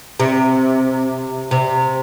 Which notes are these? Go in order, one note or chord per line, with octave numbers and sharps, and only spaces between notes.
C3
C3